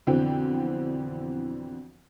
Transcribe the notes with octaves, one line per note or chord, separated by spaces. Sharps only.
F2 B2 D3 E3 C4 G5